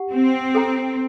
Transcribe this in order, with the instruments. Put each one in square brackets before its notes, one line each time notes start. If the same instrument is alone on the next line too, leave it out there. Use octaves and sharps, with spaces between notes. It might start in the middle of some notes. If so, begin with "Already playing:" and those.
Already playing: [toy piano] G4 F#5
[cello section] C4
[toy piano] A4 C5 G5 A#5